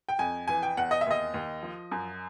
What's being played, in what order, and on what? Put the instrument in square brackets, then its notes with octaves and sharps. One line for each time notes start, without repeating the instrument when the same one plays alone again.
[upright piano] G5
F2 G#5
E3 G#5
G5
E2 F#5
D#5
E5
D#2 D#5
D#2
F3
F#2